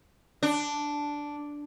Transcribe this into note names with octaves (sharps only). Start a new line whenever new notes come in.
D4